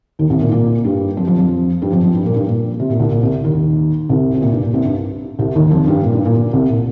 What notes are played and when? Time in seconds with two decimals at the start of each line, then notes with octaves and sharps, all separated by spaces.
0.19 D#2 D#3
0.30 C2 C3
0.41 A#2 A#3
0.52 A#2 A#3
0.84 G2 G3
1.17 F2 F3
1.27 F2 F3
1.38 F2 F3
1.82 G2 G3
1.92 F2 F3
2.03 F2 F3
2.15 G2 G3
2.25 A#2 A#3
2.36 G2 G3
2.47 A#2
2.80 C3
2.90 A#2
3.00 C2 C3
3.12 A#2
3.23 C2 C3
3.44 D#2 D#3
4.09 C2 C3
4.34 C3
4.42 A#2
4.52 G2
4.63 A#2
4.74 C2 C3
4.85 G2
5.39 C2 C3
5.55 D#2 D#3
5.71 F2 F3
5.87 G2 G3
6.03 A#2
6.14 G2
6.26 A#2
6.36 A#2
6.53 C2 C3
6.70 A#2